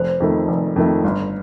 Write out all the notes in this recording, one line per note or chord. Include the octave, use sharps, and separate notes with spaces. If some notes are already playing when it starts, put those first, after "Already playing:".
Already playing: F1 C5
F2 D#3 A3
F1
F2 D#3 A3
G1